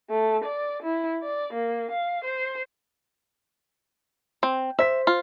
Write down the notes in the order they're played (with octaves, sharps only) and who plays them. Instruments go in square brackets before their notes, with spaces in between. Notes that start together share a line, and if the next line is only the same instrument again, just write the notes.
[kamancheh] A3
D5
E4
D5
A#3
F5
C5
[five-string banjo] C4
[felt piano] C5 B6 [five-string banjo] E5
[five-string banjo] F4